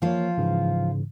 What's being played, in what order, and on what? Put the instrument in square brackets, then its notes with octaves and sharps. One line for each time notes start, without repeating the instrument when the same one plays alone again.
[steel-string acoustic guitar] F3 F4 [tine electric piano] A#3 C#5
[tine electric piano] G#2 C#3 E3